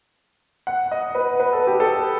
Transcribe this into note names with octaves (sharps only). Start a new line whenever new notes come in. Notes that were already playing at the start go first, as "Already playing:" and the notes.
F#5
D#5
B4
B4
A4
G4
A4